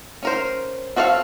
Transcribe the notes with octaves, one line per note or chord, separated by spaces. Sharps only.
C#4 A#4 C5
C4 F#4 A4 E5 F5